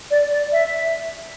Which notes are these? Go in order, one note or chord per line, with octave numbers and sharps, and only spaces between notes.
D5
D5
E5